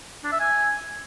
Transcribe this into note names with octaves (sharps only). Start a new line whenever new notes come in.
D4
E5
G#5